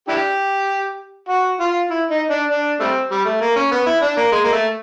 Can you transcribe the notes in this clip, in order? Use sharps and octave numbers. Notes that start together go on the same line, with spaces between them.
D4 E4 G4
F#4
F4
E4
D#4
D4
D4
G3 A3 C4
G3
A3
A#3
C#4
B3
E4
D4
A#3
G#3
A#3
A3